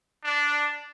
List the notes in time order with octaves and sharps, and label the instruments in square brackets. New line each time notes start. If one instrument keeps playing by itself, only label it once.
[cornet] D4